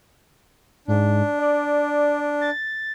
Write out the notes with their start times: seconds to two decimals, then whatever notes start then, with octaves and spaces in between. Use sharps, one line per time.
0.88 G#2 D4
1.39 D5
2.41 A6